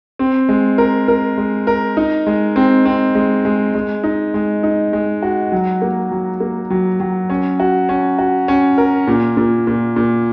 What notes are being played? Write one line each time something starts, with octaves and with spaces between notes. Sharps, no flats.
C4
G#3
A#4
A#4
G#3
A#4
D#4
G#3
C4
C4
G#3
G#3
G#3
D#4
G#3
D#4
G#3
F#4
F#3
A#3
F#3
A#3
F#3
F#3
C#4
F#4
C#4
F#4
C#4
A#4
A#2
A#2
A#2
A#2